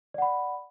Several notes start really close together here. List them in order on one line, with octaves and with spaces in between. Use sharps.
D5 F#5 B5